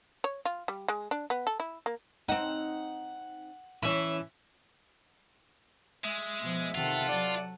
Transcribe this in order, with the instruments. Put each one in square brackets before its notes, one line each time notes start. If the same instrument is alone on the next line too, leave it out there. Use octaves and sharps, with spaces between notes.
[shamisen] C#5
F4
G3
G#3
D4
B3
A4
E4
A#3
[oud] C4 D#4 [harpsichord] F#5
[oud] E3 C#4 [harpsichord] E5 B5
[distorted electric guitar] G#3 [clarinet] E5
[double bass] B2 F3
[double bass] C3 D#3 [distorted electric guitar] F4 [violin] A4 F#5
[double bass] F#3 [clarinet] D5